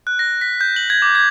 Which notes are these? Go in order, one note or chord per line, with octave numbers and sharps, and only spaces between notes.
F#6
A#6
B6
G6
F#7
G#6
D6
G#6